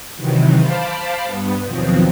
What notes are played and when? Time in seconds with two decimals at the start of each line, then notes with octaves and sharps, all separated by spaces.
0.15 C3 D#3 E3 F#3
0.58 C5 F5 A5 B5 D6
1.24 G2 B3
1.64 D#2 B2 F3 F#3 C4